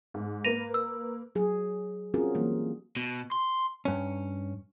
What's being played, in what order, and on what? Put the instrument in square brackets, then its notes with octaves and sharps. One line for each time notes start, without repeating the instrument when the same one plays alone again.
[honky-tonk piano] G#2
[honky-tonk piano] A#3 B4 [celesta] A#6 D#7 F7
[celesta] E6
[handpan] F#3 G#4
C4 C#4 F4 F#4 G#4 A#4
E3 F#3 G3 A#3
[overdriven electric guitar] B2
C6
[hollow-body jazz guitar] G2 C#4